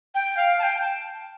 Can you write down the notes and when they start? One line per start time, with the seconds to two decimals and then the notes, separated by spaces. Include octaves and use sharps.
0.15 G5
0.37 F5
0.59 A5
0.63 G5
0.82 A5